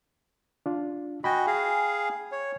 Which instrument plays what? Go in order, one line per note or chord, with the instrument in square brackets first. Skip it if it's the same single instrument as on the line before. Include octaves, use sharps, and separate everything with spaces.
[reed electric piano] D4 F4
[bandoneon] F#4 D#5 [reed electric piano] G5 G#5 B5
[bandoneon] G#4 F5
C#5